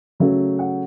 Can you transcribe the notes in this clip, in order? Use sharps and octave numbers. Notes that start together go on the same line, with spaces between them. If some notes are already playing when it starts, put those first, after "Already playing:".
C#3 F#3 A3 E5
F#5